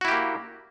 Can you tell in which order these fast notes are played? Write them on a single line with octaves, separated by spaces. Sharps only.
F#4 E4 G4 A#3